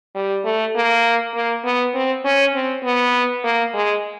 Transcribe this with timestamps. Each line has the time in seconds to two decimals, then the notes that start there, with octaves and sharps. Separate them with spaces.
0.15 G3
0.45 A3
0.76 A#3
1.35 A#3
1.65 B3
1.94 C4
2.25 C#4
2.54 C4
2.84 B3
3.44 A#3
3.74 G#3